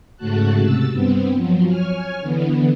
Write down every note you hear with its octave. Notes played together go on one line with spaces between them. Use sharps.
G#2 C#3 A3 F#4 A5 F#6
C3 E6 A6
G2 B3 C4
F3 F#3
C#5 G#5 F6
D3 E3 B3